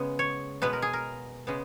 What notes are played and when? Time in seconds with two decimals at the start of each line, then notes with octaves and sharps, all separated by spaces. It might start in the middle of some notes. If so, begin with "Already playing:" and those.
Already playing: C#3 G#3 B3
0.19 C#5
0.62 B2 G#3 B3 B4
0.73 A#4
0.82 G#4
0.93 A#4
1.47 C#3 G#3 B3